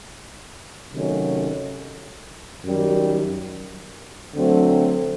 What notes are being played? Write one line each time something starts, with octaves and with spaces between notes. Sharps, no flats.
C3 D#3 F#3 A3 C#4
F#2 D#3 G3
D3 F#3 A3 C4